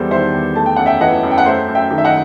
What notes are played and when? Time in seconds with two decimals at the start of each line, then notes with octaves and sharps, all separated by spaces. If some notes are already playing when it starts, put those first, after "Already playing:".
Already playing: E2 G3 A4 C5
0.11 D#3 C5 E5
0.34 E2
0.55 A3 A5
0.66 G5
0.76 F#2 F#5
0.86 E5 G5
1.01 E3 D#5 F#5
1.23 F#2
1.31 G5
1.38 F#5
1.45 A3 C5 E5
1.68 F#2
1.75 E5 G5
1.90 D#3
1.98 E5
2.05 D#5 F#5